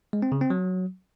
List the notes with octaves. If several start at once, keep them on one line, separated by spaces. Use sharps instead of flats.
G#3
C4
C#3
C4
F#3